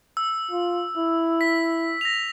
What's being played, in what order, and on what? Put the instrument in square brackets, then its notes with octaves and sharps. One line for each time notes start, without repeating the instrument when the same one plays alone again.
[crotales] E6
[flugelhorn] F4
E4
[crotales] B6
A#6 F7